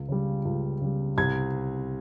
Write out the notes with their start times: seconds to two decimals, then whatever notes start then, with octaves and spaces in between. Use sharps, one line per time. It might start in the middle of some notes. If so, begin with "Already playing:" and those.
Already playing: C#2
0.09 C#3 G3
0.45 C#2
0.81 C#3 G3
1.18 C2 G#6